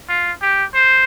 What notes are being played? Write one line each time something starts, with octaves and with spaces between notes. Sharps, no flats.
F4
G4
C5